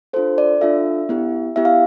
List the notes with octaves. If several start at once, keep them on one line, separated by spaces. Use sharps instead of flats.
D4 F4 A4 C5
D5
D4 F4 A4 E5
B3 E4 G4
B3 E4 G4 E5
F5